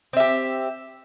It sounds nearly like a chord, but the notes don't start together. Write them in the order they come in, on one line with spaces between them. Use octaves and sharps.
C4 E5 G4